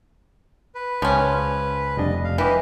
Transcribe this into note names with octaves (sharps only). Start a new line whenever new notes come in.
B4
C#2 F3 C#4
F1 G3 D4 D#5
F5
E3 G4 B4 D#5